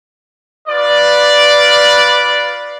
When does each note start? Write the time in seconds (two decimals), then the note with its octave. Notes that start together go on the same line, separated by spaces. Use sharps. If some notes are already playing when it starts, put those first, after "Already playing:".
0.68 F4 B4 D5